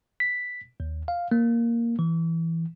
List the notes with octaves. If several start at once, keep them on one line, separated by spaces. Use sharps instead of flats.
B6
D#2
F5
A#3
E3